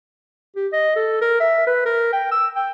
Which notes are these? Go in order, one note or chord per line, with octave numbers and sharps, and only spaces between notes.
G4
D#5
A4
A#4
E5
B4
A#4
G5
E6
G5